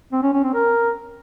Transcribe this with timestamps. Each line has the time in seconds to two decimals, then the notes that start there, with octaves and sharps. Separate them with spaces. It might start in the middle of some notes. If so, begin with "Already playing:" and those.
0.13 C4
0.23 C#4
0.33 C#4
0.44 C4
0.54 A#4